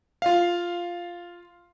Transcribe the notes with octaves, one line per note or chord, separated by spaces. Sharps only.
F4 F5